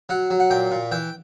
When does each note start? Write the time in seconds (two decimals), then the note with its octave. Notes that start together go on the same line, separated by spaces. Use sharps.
0.09 F#3 F#5
0.30 F#3
0.40 F#5
0.50 A#2 G5
0.71 A#2
0.91 E3 G5